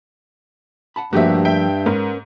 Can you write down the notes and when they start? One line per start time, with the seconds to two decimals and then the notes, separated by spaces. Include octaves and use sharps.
0.96 F#5 A5 B5
1.13 G2 F3 A3 A#3 F#4 G4 E5
1.45 E5 G5
1.86 G#2 C#4 A#4 B4